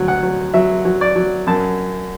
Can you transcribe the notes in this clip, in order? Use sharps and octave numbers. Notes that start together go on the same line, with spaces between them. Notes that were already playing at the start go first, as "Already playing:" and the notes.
Already playing: D2 F#3
F#5
F#3
F#3 E5
F#3
D5
F#3
F#2 A5